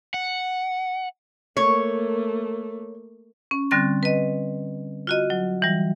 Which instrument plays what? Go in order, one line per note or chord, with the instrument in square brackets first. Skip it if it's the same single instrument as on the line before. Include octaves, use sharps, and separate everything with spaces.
[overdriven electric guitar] F#5
[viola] A3 A#3 [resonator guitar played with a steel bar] C#5
[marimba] C#4
D3 G3 C4 F#6 A6
B4 D#5
F4 F#4 D#5
F#3
E3 G3